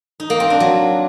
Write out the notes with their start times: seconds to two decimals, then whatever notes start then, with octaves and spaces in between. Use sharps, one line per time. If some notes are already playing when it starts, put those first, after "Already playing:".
0.20 D#4
0.30 A#3
0.40 C4
0.50 D4
0.60 F#3